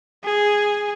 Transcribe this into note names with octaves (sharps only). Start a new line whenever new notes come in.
G#4